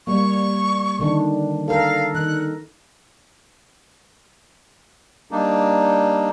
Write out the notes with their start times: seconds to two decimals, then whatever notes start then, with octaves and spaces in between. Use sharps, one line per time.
0.07 G3 A#3 C#6
0.99 D3 D#3 D4
1.68 A4 A#4 F5
2.15 D#3 F#6
5.31 G3 A#3 D4 D#4